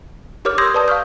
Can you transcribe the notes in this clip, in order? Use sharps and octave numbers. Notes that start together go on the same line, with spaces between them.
G4 A#4 C#5 D6 F6
C6 D#6 E6 G6 G#6 A#6
B4 D5 A5 D#6
F5 C#6 F6 G6